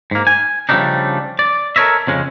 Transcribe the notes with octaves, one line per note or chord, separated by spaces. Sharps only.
G#2 A#3
G#5
C#3 F3 G3 A3 D4 D#4
D5
A4 A#4 C5 C#5 D#5 E5
F2 C#3 G#3